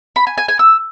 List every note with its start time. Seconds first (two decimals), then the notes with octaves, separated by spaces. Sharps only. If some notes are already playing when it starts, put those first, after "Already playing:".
0.16 B5
0.27 G#5
0.38 G#5
0.48 G#5
0.59 E6